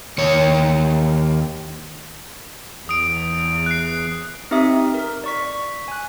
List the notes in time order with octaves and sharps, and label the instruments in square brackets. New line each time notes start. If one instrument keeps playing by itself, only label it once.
[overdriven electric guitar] D#2 C#5
[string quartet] E2 [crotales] D#6 D7
[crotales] F#6 C7
[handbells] C4 D#4 G4 E5 D#6
A#4
D5 C#6 B6
G#5 F#6